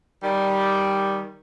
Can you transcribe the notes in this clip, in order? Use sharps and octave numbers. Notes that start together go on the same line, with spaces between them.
D#3 G3